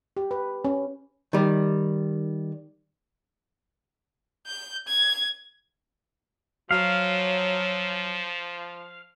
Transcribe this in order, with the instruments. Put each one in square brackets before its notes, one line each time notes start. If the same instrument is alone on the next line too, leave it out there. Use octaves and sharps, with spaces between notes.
[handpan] G4
B4
C#4
[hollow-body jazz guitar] D#3 G3
[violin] G6
G#6
[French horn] F3 [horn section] F#3 [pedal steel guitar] F5